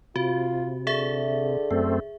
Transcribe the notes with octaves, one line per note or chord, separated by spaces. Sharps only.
C3 F4 F#4
D3 G#4 E5
F#2 A3 C4